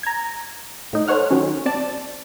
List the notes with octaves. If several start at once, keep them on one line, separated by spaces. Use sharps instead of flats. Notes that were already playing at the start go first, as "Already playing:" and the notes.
A#5 G#6
A2 D#4
A4 C5 C#5 F#5 F6
D#3 F#3 C#4
C4 D5 A5